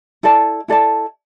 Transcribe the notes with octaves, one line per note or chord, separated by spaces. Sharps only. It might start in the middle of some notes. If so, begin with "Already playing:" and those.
E4 A4 D5 A5
E4 A4 D5 A5